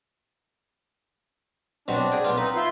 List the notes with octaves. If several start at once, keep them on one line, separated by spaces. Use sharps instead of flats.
B2 F#3 C4 D4
G#4 G5
B1 B3 F4
C4 D#4 B4
E4 F4 C6